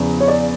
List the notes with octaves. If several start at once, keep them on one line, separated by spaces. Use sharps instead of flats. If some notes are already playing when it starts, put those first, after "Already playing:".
Already playing: E2 C#3 F3
C#5
D5